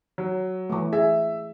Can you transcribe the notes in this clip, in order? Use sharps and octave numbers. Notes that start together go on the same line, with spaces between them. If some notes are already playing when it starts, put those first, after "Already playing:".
F#3
E3 A3
G#4 E5